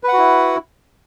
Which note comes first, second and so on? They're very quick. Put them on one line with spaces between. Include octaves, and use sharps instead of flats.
B4 F#5 F#4 E4